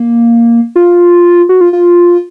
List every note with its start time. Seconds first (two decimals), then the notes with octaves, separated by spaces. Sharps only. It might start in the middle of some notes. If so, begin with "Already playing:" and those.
Already playing: A#3
0.76 F4
1.49 F#4
1.61 F4
1.73 F4